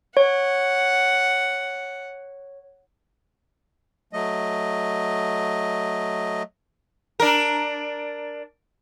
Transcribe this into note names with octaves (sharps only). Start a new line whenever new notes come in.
C#5 F#5
F#3 A3 D#5
D4 A#4